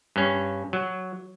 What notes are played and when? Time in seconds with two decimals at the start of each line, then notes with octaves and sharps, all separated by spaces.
0.16 G2 C#4
0.73 F#3